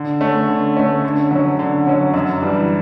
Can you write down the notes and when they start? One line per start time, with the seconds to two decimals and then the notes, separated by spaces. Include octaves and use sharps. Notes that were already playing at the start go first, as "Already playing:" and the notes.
Already playing: D3
0.21 A3 C#4
0.48 D3
0.77 A3 C#4
1.04 D3
1.31 F#3 C#4
1.59 D3
1.87 F#3 C#4
2.14 F#2
2.42 E3 G3 D4